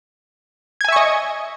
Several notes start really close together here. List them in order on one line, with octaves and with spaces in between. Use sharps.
G#6 G#5 E5 C#6 D#5